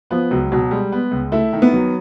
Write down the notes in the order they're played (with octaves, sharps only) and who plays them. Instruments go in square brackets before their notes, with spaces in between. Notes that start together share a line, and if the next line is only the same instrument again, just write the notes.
[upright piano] F3 [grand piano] B3
[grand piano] C#2 [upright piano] F#3
[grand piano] B2 [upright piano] F#3
[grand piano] G3 [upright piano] G#3
[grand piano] B3
C#2
[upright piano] A3 [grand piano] E4
[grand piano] D#3
[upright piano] B3
[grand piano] F#3